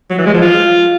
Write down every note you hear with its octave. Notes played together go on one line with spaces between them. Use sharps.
F#3
E3
G#3
F3
F4